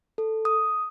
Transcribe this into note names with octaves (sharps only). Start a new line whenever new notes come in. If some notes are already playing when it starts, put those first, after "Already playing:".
A4
D#6